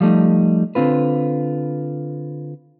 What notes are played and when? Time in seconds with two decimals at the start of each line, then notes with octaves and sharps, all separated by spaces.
0.01 F3 G3 A3 D#4
0.75 D3 C4 F4 B4